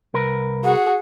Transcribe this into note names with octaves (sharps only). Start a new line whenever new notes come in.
C2 A#4 B4
F#4 G#4 F#5